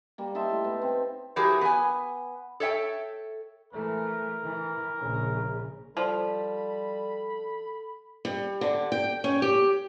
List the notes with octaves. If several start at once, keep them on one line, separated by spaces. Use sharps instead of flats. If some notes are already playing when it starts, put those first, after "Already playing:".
G3 A#3
D#4 E5 A5 C6
A2
B3
C4
E3 F#3 G4 G#4 A#4
B3 G#5
A4 C#5 E5 G5
E3 A3 A#4
E3
A#1 C#3
F3 G3 A4 B5
G3
D3
G5
C#4
G4